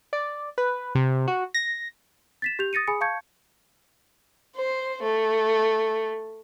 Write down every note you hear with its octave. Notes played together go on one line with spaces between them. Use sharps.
D5
B4
C3
F#4
A#6
A6 B6 E7
G4 G6 F7
D#6 A6 A#6 C#7 D#7
G#4 G#5 B5 D#6 C#7
F5 A5 C#6 G6 G#6 C#7
C5
A3